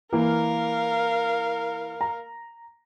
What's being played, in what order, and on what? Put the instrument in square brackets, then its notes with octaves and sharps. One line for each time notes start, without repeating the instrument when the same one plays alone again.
[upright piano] E3 A#3 [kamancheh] A#4 F5
[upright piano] A#5